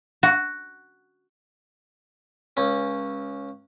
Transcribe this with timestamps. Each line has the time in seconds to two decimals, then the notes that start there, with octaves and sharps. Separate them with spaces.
0.23 F#4
2.57 C#2 C#4